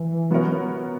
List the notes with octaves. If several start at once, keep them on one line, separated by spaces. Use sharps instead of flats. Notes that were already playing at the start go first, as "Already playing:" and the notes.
Already playing: E3
F#3 B3 F#4 A#4 C#5